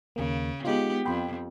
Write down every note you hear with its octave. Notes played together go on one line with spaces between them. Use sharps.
D#2 C#3 A#3
G#3 B3 D#4 F4 G4
F2 G5 B5 C6